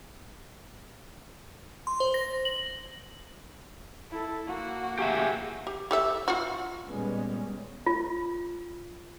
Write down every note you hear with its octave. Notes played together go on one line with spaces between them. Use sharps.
C6
C5
A#6
F#7
E4 A4
A#3 F#4
G4 G#4 E5
G4
G4 A4 E5
F4 F#4
A#2 G3 G#3 B3 C#4
F4